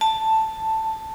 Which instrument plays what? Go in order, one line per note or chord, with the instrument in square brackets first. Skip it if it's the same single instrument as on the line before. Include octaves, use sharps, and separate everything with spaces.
[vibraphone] A5